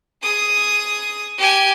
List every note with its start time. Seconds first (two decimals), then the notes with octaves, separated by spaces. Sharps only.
0.23 G#4 D#6
1.38 G4 G#5